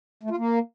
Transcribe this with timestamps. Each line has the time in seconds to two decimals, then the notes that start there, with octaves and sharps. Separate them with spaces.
0.23 A3
0.30 F4
0.37 A#3